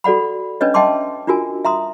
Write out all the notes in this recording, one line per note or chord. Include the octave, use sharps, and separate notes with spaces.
F#4 A4 D5 F#5 B5
C#4 D4 B4 C#5 D#5
D#5 E5 G5 A5 C6 D6
D4 F4 F#4 A#4 G#5
E5 A#5 C6 D#6